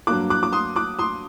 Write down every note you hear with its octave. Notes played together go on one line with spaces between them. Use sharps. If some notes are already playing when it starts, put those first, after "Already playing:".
G2 F#3 A#3 D6 F#6
D6 F#6
D6
C6 D#6
D6 F#6
C6 D#6